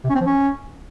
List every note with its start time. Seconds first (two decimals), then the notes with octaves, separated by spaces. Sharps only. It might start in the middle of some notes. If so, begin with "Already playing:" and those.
0.04 C3
0.10 C#4
0.15 C4
0.21 F3
0.26 C#4